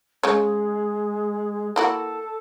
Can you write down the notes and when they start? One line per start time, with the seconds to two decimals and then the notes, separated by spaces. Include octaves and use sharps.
0.23 C#3 G#3 C#5
1.76 A#3 E4 F#4 A4